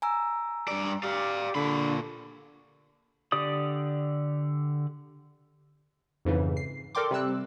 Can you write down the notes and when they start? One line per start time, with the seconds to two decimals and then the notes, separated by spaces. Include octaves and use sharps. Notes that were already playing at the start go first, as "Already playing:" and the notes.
0.02 G#5 A#5 E6
0.68 G2 D5
1.03 G4 D5 F5
1.55 A#2 D3 B5
3.32 D3 G4 D5 D#6
6.25 F2 G#2 C#3 E3
6.57 C7
6.95 A4 A#4 D5 G5 C6 D6
7.11 C3 G3 C4 E6 F#6